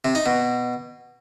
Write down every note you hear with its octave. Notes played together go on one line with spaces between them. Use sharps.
C3
D#4
B2